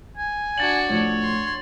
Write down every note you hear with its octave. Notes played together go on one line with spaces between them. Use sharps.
G#5
D4 F#4 A6 F#7
A2 F3 C#5
C6